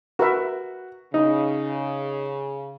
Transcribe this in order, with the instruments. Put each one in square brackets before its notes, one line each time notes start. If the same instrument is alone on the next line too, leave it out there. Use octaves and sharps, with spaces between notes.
[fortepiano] F#4 [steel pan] A#4 B4 E5
[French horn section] C#3 [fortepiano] D#4